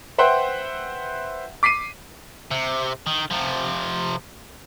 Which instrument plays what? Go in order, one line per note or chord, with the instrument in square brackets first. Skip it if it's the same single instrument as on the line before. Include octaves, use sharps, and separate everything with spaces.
[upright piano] B4 C5 E5 F#5 G5 C6
D6 B6 C7 D#7
[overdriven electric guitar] C3
D#3
C3 F3